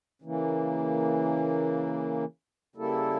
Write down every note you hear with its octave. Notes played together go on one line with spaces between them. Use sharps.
C#3 E3 A#3
C#3 G3 A#3 E4 A4